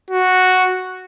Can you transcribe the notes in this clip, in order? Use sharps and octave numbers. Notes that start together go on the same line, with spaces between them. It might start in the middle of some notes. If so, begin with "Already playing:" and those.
F#4